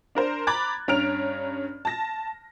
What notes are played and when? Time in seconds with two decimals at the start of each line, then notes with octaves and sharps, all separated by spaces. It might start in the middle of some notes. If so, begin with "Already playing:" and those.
0.15 D4 A#4 C5
0.47 A#5 B5 D6 F#6 G#6 A6
0.88 G2 C#4 A#5 F6 D7 F7
1.85 A5 A#6